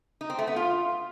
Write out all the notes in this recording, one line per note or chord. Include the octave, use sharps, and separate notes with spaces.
D#4
C4
A3
B3
F4